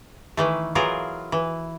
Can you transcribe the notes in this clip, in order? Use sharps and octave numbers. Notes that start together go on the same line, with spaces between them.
D#3 E3 A3
E3 F#3 F4 G#4 A#4
E3